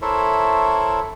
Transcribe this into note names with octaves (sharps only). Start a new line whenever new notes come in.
E4 A4 A#4 C5 C#5 E5